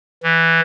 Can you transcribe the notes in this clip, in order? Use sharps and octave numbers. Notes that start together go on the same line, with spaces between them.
E3